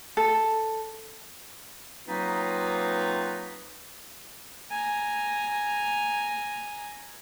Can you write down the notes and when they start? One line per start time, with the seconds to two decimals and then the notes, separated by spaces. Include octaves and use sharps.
0.17 A4
2.08 F#3 A#3 C4 D#4 F4 B4
4.70 G#5 A#5